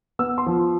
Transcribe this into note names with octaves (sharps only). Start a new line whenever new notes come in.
B3 E6
C6
F3